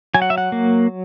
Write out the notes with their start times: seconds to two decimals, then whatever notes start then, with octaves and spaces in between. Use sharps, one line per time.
0.15 F#3 G#5
0.22 F#5
0.30 E5
0.38 F#5
0.52 A#3